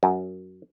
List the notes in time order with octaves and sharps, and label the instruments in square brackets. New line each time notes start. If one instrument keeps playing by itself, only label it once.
[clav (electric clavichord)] F#2